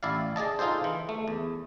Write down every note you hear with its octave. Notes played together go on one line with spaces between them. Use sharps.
A1 E4 D5 F5
G#4 D5 D#5 A5
D#4 F4 G#4 A4 C5
E3
A3
E2